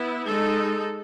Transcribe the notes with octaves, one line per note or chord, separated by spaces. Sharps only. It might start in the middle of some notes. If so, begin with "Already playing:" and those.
Already playing: B3 E4
G#3 D#4 A4